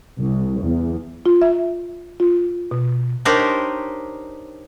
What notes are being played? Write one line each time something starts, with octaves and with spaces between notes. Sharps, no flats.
C2
E2
F4
E5
F4
B2
D4 D#4 G4 A#4 C5 C#5